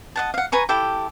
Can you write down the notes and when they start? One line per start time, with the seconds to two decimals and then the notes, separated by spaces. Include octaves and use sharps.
0.16 D#5 F#5 A5
0.34 F5 F#5
0.52 B4 G#5 A#5 C#6
0.69 E4 G4 A4 G5